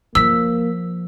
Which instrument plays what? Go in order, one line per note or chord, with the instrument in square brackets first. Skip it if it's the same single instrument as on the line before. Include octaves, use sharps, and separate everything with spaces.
[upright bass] F3 [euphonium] A#3 [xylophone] E6 B6